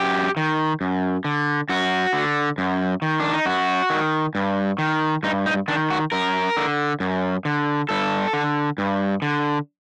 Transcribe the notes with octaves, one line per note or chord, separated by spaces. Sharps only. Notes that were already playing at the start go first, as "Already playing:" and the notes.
Already playing: F#2 G4
D#3
F#2
D3
F#2 F#4
D3
F#2
D#3
D4
D#4
F#2 F#4
D#3
G2
D#3
G2 D#4
D#4
D#3 D4
F#4
F#2 A#4
D3
F#2
D3
G2 A4
D3
G2
D3